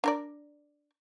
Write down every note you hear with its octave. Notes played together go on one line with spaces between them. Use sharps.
D4 A#4 D5